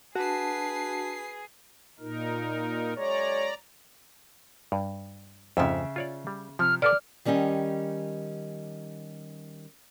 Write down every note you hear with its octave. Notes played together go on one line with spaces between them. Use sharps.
D4 F#4 G#4 B4 A5 C7
A#2 D#4 A#4
F#2 G#3 C#5 D5 A#5
G2
F2 G#2 C#3 F3 E5
F4 C#5 D5
G3
C3 F3 F6
A4 B4 D5 F#5 D6 F6
D#3 G3 C#4 G4 D#5